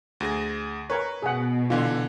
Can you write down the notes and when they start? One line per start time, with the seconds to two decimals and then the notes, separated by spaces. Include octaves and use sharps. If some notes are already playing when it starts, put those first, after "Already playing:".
0.20 D2 G#4 A#6
0.90 A#4 B4 C#5
1.22 B2 G#4 F#5
1.70 D3 E3 F4